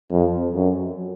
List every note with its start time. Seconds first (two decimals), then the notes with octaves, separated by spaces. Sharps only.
0.12 F2
0.55 F#2